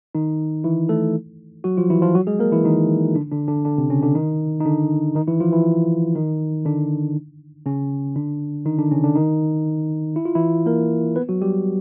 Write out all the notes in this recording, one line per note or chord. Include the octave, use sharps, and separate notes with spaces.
D#3 D#4
E3 E4
A3 A4
F#3 F#4
F3 F4
E3 E4
F3 F4
F#3 F#4
G#3 G#4
A#3 A#4
E3 E4
D#3 D#4
D3 D4
D3 D4
D3 D4
D3 D4
C3 C4
C#3 C#4
D3 D4
D#3 D#4
D#4
D3 D4
D#3 D#4
E3 E4
F3 F4
E3 E4
D#3 D#4
D3 D4
C#3 C#4
D3 D4
D#3 D#4
D3 D4
C#3 C#4
D3 D4
D#3 D#4
E4
F4
E3 E4
A#3 A#4
B3 B4
F#3 F#4
G3 G4